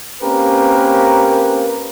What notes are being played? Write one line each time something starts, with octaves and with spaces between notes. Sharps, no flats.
A#3 C4 C#4 G4 A#4 B4